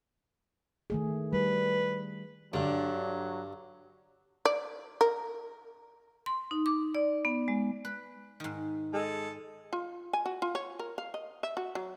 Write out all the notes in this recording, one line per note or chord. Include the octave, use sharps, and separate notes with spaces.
D#3 A3 G#4
G3 B4
G2 D3 F#3
D5
A#4
C6
D#4
D6
D5
B3
G#3
B4
G#2 D#3
G#3 A4
F4
G#5
F#4
F4
C#5
A#4
F5
D#5
E5
F#4
F#3